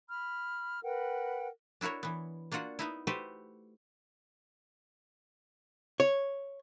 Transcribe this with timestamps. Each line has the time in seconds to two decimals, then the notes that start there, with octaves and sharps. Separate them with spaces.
0.08 B5 F6
0.83 A#4 B4 F#5 G5
1.81 D4 E4 F#4 A#4 C#5
2.03 E3 B3
2.52 A#3 D4 F4 F#4 F#5
2.79 B3 D#4 E4
3.07 A3 F#4 G4 B4 C5
6.00 C#5